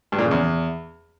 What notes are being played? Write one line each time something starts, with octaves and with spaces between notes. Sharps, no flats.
G2
A#2
C#3
E2